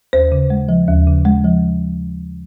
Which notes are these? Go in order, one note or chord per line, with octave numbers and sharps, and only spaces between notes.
D#2 C5
C#3
G#3
F3
D#2
C#3
G#3
F3